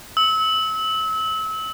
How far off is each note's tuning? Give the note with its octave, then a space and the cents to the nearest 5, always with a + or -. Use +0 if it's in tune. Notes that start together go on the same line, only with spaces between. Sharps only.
E6 -30